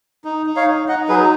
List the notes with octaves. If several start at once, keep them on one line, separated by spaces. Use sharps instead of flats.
D#4
D#4
C#5 F5
D#4
D#4 D#5 F#5
F#3 G#4 B4